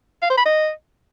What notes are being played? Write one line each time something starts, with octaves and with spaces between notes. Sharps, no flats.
F5
C5
B5
D#5